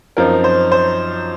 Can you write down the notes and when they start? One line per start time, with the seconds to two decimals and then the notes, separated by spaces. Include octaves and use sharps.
0.17 F#2 F3 C4 D#4 A#4
0.44 C5
0.72 C5